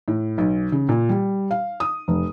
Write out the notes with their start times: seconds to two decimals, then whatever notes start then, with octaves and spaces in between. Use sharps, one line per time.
0.08 A2
0.38 B1
0.72 C#3
0.89 A#2
1.09 G3
1.51 F5
1.80 D#6
2.08 F1